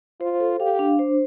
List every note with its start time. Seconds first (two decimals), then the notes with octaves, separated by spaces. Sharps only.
0.21 F4 C5
0.40 A4
0.60 G4 F5
0.79 D4
0.99 C5